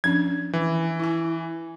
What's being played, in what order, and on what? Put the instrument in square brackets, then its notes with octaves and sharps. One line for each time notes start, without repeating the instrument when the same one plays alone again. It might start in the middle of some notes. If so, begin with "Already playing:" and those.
[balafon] F3 C#4 D4 [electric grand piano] G#6
[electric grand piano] E3
[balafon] E4 G#5